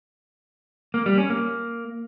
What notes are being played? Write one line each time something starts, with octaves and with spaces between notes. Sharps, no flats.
A#3
G3
C#4
A#3